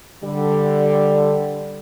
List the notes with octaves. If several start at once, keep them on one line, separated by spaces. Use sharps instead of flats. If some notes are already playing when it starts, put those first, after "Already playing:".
D3 G3